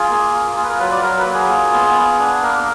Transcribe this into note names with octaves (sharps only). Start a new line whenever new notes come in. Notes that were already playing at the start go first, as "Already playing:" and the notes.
Already playing: F4 G#4
A#3
F4
F4 G#4
B4
A#4
F#3 B4
D5
F#3 A#4
B4
A#3
G#4
F4
B3
B3
D4
A#3 A#4